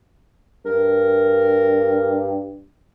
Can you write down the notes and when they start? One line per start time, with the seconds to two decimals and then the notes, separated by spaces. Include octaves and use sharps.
0.66 G2 A#4